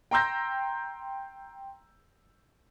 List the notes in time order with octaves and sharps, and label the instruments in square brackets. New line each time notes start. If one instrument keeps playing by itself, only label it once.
[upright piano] G5 A#5 C6 E6 G6 A#6